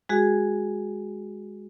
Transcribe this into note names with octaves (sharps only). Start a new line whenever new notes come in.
G#3 F#4 G#4